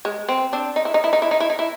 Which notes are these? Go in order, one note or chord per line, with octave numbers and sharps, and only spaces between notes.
G#3
C4
C4 D4
D#4
E4
D#4
E4
D#4
E4
D#4
E4
D#4
E4